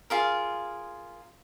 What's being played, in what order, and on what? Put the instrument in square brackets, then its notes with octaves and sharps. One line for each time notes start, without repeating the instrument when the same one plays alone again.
[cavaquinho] F4 G#4 A#4